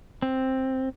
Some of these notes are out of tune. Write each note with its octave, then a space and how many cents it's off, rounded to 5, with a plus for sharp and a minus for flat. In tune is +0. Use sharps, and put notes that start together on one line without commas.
C4 +5